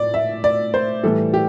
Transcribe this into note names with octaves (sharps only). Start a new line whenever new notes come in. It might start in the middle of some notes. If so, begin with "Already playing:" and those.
Already playing: A2 D5
E5
D5
C5
A2 E3 G3 A4
G4